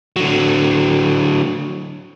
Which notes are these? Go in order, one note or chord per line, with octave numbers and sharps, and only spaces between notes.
D3 F#3